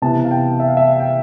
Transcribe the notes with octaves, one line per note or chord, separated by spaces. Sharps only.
C3 E3 B3 A5
F5
G5
E5
F5
E5
F5
G5